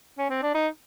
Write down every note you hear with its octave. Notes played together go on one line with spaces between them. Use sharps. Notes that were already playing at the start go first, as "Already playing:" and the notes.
C#4
C4
D4
D#4